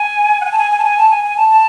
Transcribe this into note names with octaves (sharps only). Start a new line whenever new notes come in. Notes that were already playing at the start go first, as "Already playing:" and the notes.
Already playing: G#5
F#5
G#5
A5
G#5
G#5
A5
G#5
A5
G#5
G#5
A5
A5